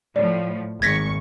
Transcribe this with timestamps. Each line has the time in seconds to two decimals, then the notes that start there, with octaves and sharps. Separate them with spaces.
0.16 A2 F3 C#5 D5
0.82 G#1 C#6 G#6 A#6 B6